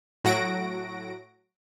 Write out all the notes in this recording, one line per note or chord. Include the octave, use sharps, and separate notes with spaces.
A2 F#3 F#4 A#6 D7